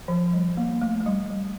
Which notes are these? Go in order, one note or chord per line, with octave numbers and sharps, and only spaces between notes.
F3
G3
A#3
A3
A3
G3
G3